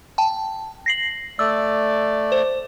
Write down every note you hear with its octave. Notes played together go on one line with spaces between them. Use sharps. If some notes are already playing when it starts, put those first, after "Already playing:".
G5 A5
A#6 C7 F#7
A3 D5 E6
C5